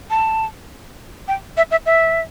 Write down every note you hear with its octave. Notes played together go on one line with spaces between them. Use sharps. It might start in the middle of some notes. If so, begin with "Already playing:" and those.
A5
G5
E5
E5
E5